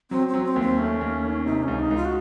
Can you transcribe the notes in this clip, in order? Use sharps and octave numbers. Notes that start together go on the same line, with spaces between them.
F#3 C4
C4
F#3
C4
D#2
C4
A3 C#4
D#2
D#3
C3 D#4
C#2 C#4
D#4
C#2
F4
F#4